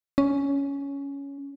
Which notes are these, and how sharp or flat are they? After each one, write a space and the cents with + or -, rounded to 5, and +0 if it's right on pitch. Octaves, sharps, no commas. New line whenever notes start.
C#4 +10